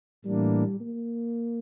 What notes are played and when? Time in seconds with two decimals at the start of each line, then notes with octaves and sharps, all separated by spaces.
0.25 A2 E3 G3 A#3 D4
0.80 A#3